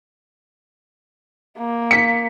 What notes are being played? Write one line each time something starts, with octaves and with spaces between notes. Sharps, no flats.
A#3
B6 C#7